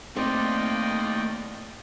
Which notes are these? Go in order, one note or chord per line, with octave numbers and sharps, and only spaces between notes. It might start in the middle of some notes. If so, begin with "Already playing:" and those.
A2 A3 A#3 C4 D#4 D5 D#5 G5